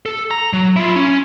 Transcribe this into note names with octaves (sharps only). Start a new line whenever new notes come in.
A4
A#5
F#3
E4 F4
C#4